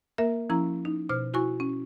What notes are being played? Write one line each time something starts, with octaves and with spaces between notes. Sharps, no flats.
A#3 A#4 E5
F3 C#4 E4 A#5
D#4
B2 C5 F6
E4 F#4 G#5 C#6
C#4